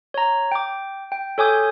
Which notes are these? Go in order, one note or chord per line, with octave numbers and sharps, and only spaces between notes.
C#5 A#5
G5 D6
G5
A4 C#5 G#5 D6 D#6 G6